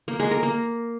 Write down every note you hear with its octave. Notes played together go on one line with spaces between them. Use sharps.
A#3
G#3
A#4
A#3